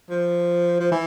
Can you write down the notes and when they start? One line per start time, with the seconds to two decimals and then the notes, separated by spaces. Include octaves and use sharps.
0.10 F3
0.80 F3
0.91 E3